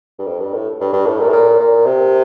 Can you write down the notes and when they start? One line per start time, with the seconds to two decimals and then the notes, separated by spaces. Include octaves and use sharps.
0.19 G2
0.27 F2
0.40 G2
0.54 A2
0.81 G2
0.93 G2
1.07 A2
1.20 A#2
1.29 A2
1.33 A#2
1.60 A#2
1.86 C3